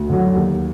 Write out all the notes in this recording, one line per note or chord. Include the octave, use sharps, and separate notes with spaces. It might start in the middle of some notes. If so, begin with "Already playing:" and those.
Already playing: D2
D3 F#3
D#2